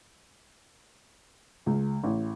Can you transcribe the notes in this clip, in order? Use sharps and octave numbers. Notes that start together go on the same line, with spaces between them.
C#2
A1